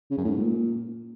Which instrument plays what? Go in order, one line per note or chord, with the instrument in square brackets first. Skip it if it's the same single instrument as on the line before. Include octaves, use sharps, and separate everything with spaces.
[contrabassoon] C#3
F#2
A2
G#2
A#2